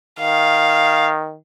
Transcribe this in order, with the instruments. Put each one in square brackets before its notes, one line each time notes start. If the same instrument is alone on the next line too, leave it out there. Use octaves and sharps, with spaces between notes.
[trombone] D#3 [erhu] F5